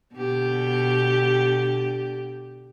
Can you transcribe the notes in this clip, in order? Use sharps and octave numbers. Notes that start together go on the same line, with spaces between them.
B2 D3 G4